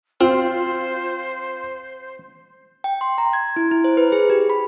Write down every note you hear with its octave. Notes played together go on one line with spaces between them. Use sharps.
C4 F4 C5
G5
C6
A#5
G#6
E4
E4
C5
B4
G#4
G4
B5